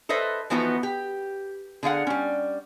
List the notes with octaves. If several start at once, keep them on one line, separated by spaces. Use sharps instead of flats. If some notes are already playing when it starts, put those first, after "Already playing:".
A4 B4 C5 D#5 E5
E3 F3 B3 D#4 F#4 B4
G4
D3 G#4 F5 F#5
G3 C#4